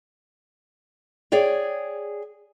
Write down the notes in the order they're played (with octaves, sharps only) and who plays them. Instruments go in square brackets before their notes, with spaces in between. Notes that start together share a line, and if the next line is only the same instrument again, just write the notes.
[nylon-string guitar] G#4 C#5 D5 G5